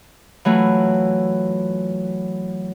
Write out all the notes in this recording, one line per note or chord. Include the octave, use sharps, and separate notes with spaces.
E3 F#3 A3 F4